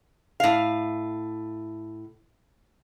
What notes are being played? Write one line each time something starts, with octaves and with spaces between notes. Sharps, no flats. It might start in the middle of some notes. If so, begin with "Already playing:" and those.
A2 F5